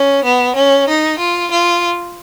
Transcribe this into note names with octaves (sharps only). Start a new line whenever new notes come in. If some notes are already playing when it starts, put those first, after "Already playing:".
Already playing: C#4
B3
C#4
D#4
F4
F4